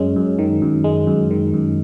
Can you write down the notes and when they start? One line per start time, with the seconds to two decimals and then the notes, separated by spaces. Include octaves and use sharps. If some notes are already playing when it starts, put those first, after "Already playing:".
Already playing: F#2 G#3 C#4
0.16 F#2
0.39 D#3
0.62 F#2
0.84 G#3
1.07 F#2
1.31 D#3
1.54 F#2